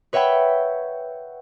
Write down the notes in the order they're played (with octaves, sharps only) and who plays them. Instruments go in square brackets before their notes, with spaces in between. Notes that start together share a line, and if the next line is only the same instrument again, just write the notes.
[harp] B4 C#5 E5 F#5 G5 B5